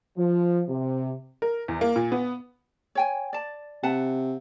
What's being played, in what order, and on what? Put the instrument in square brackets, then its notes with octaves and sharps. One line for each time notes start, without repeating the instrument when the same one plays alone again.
[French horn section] F3
C3
[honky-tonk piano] A#4
E2
A#3
A#2
B3
[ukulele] C#5 G5 G#5
D5 A5
[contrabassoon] C3 [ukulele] B4 F#5 A5